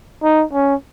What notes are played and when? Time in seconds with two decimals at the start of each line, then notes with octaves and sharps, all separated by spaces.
0.23 D#4
0.53 C#4